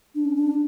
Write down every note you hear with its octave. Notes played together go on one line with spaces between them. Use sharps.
D4
C#4
D4